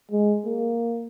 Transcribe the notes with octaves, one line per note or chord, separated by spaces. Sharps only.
G#3
A#3